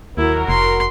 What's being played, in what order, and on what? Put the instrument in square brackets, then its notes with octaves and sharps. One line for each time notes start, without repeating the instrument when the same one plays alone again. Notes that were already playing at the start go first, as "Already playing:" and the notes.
[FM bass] D#2 [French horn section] F#3 F#4 A#4 [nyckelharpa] E4
[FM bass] F1 [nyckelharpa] C6